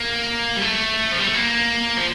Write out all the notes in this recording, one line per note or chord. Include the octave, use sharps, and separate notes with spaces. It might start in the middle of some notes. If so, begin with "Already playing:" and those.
Already playing: A#3
G3
A3
F3
G3
A3
A#3
F3